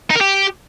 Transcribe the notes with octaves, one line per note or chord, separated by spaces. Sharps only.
D#4
A#4
G4